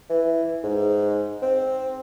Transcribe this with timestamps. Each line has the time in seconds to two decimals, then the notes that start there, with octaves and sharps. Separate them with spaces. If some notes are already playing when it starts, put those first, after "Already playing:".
0.10 E3
0.64 G#2
1.42 C4